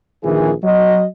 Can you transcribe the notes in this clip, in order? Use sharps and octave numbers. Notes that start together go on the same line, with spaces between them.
A#1 D#3 E3 G#4
F#3 D#5